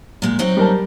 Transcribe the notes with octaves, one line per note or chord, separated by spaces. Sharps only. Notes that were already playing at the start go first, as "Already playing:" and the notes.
A#2 G#3
F#3 C4 D#4
G3 A#4 A5